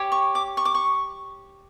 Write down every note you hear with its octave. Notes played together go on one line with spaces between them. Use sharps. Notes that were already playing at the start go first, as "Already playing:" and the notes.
Already playing: G4 C#5
C#6
D6
C#6
D6
C#6